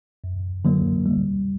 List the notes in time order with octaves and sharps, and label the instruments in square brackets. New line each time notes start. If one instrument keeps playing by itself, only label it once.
[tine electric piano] F#2
D3 F#3 A#3
G3